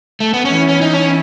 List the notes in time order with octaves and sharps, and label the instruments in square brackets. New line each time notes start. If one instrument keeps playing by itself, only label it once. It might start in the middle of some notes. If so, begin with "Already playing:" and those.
[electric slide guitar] A3
B3
[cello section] E3 B3 E4 [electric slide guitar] C#4
[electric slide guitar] C#4
D#4
C#4